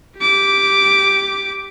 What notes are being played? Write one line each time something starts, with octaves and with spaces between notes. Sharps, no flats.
G4 D6